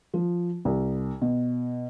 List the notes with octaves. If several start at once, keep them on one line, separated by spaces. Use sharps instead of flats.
F3
C2
B2